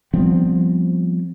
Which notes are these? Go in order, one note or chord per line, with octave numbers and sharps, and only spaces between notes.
F3 G3 B3 C4